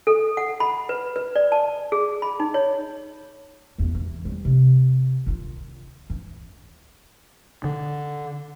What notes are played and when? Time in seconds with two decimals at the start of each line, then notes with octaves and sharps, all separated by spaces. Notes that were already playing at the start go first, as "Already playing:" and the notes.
0.07 A4
0.37 F#5
0.60 B5
0.89 B4
1.16 B4
1.36 D5
1.52 A5
1.92 G#4
2.22 B5
2.40 D#4
2.54 C#5
3.78 A1 E2
3.95 E3
4.25 G3 A3
4.45 C3
5.26 D#3 F4
6.10 E3
7.64 D3